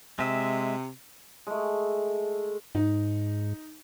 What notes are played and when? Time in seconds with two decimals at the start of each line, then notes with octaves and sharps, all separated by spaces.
0.19 C3 G#3 E5
1.47 G#3 A3
2.75 G#2 D#4